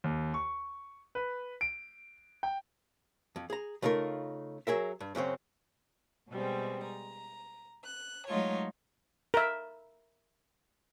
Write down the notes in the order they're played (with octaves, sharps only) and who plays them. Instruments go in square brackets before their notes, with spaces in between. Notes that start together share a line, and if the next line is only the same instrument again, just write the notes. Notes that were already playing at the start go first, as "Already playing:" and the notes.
[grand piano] D#2
C#6
B4
D7
G5
[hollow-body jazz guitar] F2
G#4 A#5
C#3 A3 D#4 F4 A#4
F#3 G#4 A#4 E5
G2
F#2 C#3 F#3 C4
[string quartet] B2 G3 G#3 C4
A#5
F#6
F#3 G#3 A3 D#4 F4 C#5
[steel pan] A#4 E5